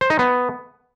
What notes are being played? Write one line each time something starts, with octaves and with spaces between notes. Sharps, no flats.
C5
D#4
B3